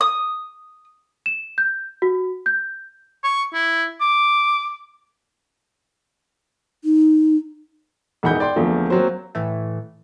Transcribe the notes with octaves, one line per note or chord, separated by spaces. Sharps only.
D#6
E7
G6
F#4
G6
C#6
E4
D6
D#4
E1 E3 D#4 F#5 B5 G6
D5 G5 C6
E2 D3 F3 A3 A#3
F#3 A#3 C4 F#4 C5
A2 E3 A3